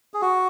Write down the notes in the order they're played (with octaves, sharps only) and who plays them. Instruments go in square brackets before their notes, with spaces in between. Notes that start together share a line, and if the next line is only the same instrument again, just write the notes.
[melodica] G#4
F#4